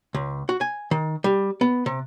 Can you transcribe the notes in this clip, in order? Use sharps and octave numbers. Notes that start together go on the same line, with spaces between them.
C#2
F#4
G#5
D#3
G3
B3
C3